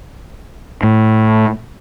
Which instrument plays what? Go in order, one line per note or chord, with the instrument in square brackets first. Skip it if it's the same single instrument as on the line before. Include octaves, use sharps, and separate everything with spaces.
[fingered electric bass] A2